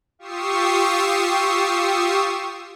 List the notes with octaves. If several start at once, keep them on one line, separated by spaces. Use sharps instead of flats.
F4 G4 C#6 D#6 E6 C7